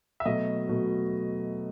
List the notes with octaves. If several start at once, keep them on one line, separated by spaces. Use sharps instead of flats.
E5
B2 F#3 A3 D#5
B2 F#3 A3